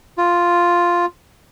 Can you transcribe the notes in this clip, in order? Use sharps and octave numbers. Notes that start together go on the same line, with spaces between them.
F4